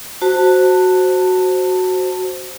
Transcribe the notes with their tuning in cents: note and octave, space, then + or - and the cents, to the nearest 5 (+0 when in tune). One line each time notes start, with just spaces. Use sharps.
F#4 +0 C5 +0 A5 +20